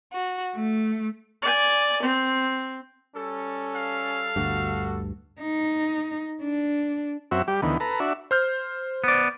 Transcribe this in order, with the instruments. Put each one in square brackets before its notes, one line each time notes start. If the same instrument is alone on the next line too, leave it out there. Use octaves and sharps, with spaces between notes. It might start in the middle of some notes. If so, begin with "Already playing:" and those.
[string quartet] F#4
A3
[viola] D5 G#5
C4
[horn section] G3 A4 [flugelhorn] C#4
[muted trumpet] F5
[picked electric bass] G1 D2 G2 [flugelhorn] F#4
[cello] D#4
D4
[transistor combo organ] F#2 C4 F#4 E5
G3 G4
D2 D#3 E3 B3
A4 B4 A#5
D4 F#4 E5
[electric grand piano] C5 F6 G6
[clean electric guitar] B3 D5